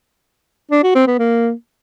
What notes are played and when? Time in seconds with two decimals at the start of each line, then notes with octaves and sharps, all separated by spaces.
0.71 D4
0.83 F#4
0.95 C4
1.07 B3
1.19 A#3